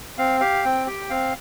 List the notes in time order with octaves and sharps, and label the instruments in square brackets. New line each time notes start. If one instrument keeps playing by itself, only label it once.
[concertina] C4 F5
G4 F5
C4 G5
G4 G5
C4 F5